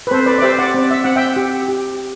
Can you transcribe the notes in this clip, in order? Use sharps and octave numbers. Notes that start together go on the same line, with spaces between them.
B4
C4 A4 C5
B4 D5
D5
G4 C5 E5
D5 F#5
C4 D5
E5
C4 F#5
E5 G5
G4
G4